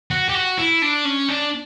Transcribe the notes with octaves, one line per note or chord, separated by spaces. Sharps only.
F#4
G4
F#4
E4
D4
C#4
D4